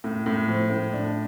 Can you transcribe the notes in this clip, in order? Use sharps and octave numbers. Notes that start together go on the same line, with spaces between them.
A2
A2
F3
A2
D4